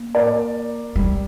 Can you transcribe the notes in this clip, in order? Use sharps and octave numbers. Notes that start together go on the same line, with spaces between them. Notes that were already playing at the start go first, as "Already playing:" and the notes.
Already playing: A#3
A#4 D5
G3